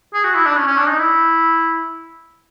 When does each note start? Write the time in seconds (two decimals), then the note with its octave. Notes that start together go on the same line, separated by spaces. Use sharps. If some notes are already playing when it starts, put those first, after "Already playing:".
0.14 G#4
0.24 F#4
0.35 E4
0.46 D4
0.57 C#4
0.67 C#4
0.77 D4
0.88 D#4
0.99 E4